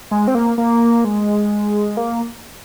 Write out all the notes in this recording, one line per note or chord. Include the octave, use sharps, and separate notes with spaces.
G#3
C4
A#3
A#3
G#3
A#3